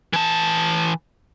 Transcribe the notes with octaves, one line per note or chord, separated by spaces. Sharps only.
E3 A5